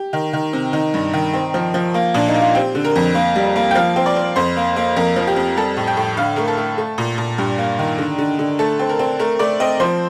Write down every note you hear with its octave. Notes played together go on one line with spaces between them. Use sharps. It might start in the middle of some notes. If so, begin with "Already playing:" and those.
Already playing: G4
D#3
D#3
C3
D#3 D#4
G2
D#3
C4
F3
F3
A#3
A#2 D4
D#4
A#3
F4
C4 G4
D3
A#4
F2
A#3
G3
A#3
G5
F3 F5
C4
D5
C4
F2 C5
A#3
A#3
F2 A#4
F3
G4
F2
G3 A4
A2
G5
A2
D3 F5
A3 A#4
A4
A3
A3
A#2
A#2
G2 G4
A#3
D#3
D3
D3
D3
A3 A4
C4
A#4
C4
A3 A#4
A3 D5
C4 D#5
F3 C5